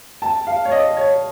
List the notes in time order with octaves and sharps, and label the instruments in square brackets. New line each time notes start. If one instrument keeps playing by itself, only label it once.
[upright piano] A5
F5
C#5
D#5
C#5